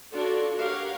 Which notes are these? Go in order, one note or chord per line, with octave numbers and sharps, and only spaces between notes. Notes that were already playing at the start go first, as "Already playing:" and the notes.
D4 F4 F#4 A4 C#5 D5
G4 A#4 C#5 F5 F#5